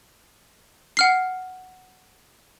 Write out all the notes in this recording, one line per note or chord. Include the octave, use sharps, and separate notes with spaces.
F#5 F6 C7